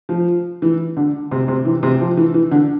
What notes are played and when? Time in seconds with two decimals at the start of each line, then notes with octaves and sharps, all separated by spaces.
0.09 F3
0.62 E3
0.97 D3
1.31 C3
1.48 C3
1.65 E3
1.83 C3
2.00 F3
2.17 E3
2.34 E3
2.51 D3